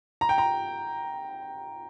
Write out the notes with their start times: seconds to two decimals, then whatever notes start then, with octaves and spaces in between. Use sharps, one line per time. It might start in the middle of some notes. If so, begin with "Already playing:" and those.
0.21 A#5
0.29 G5
0.38 A#5